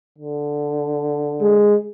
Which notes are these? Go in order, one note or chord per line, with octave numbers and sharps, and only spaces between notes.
D3
G#3